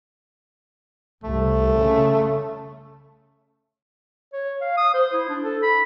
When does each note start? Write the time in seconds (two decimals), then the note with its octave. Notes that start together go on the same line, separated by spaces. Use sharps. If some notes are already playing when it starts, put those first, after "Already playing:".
1.24 C2 A3
1.74 C#3
4.33 C#5
4.61 F5
4.77 D#6
4.94 C5
5.14 E4
5.29 D4
5.44 A4
5.63 B5